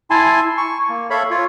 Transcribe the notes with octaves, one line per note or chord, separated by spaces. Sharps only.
E4 G#5 A5 C6
C#6
A#3
A4 C#5 E5 F5 B5
F4 C#5